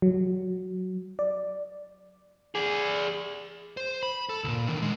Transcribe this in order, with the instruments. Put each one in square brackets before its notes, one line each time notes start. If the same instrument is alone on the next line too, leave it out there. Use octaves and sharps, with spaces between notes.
[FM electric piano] F#3
D5
[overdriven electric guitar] G#4 D5
[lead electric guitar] C5
B5
A4
C#2 A#2
D3 D#3
B2 G#3